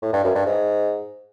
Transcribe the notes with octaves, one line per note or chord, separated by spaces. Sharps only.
A2
G2
F#2
G2
G#2